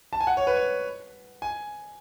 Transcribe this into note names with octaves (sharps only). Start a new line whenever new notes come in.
A5
G#5
F#5
C#5
B4
C#5
G#5